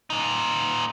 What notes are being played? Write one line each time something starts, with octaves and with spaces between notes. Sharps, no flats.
A#2 D#4